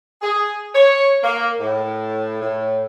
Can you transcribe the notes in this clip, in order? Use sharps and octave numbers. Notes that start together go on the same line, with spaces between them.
G#4
C#5
A#3
A2
A2